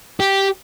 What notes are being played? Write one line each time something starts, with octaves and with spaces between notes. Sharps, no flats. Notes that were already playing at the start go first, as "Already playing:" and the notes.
G4